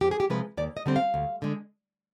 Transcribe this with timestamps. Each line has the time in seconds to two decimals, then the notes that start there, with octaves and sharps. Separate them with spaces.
0.01 F2 G4
0.11 G#4
0.20 G4
0.30 C3 F3 G#3 B4
0.57 D#2 D5
0.77 D#5
0.86 D3 G3 C4
0.96 F5
1.14 D2
1.42 D3 G#3